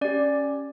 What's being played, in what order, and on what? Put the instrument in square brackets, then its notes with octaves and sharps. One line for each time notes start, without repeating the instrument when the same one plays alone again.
[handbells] C#4 G4 D5